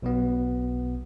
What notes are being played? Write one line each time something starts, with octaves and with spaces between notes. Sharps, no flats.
B1 B2 B3